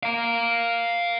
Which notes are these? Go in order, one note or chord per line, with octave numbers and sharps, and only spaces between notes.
F5 A#5